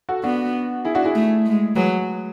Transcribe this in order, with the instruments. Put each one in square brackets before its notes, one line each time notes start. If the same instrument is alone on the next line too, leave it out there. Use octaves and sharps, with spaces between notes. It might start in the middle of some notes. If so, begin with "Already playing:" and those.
[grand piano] F#4 A4
[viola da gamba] B3 [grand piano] D4 F#4
[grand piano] E4 G#4
D4 F#4
E4 G#4
[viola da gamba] A3
G#3
[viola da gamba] F#3 [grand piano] G#4 B4